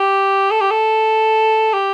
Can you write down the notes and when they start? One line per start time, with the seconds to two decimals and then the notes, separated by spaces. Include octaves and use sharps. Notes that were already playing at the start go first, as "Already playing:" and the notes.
Already playing: G4
0.51 A4
0.61 G4
0.71 A4
1.74 G4